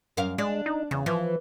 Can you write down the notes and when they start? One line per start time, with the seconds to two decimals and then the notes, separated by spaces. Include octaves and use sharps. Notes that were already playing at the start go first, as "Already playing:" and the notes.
0.17 F#2 A#4 F5
0.38 G#3 D4
0.66 D#4
0.91 E2 C#3
1.06 E3 F3